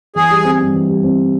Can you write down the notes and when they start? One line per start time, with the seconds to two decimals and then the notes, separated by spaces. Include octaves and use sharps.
0.16 E3 G#4
0.31 G3
0.45 C4
0.59 G2
0.74 E3
0.89 G3
1.04 C4